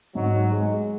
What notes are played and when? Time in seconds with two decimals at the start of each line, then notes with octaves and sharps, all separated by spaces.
0.15 G#2 F#3
0.52 G#3